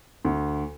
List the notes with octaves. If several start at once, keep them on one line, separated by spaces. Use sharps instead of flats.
D2